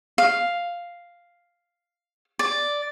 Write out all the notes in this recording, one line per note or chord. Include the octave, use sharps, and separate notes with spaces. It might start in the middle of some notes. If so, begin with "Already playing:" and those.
F5
D5